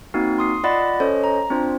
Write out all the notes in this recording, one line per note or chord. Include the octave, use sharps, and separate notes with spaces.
A#3 C4 D#4 F#4
C6 D#6 C7
F4 D5 D#5 F#5 B5 A6
C#4 A4 C5 C#5 D#5
A#5
C4 D4 F4 C5